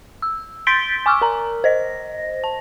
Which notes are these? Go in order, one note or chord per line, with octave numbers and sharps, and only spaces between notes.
E6
C6 G6 A6 B6 D7 G7
G#5 C#6 D6 E6 F6
A#4 A#5
C5 D#5 A#6
A5